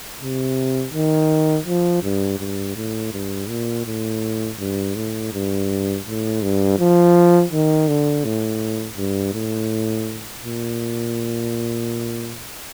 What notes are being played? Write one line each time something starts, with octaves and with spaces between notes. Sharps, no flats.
C3
D#3
F3
G2
G2
A2
G2
A#2
A2
G2
A2
G2
A2
G2
F3
D#3
D3
A2
G2
A2
A#2